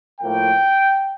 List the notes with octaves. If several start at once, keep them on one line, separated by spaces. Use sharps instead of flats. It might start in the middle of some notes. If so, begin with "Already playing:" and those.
A2 F3 A#3 G5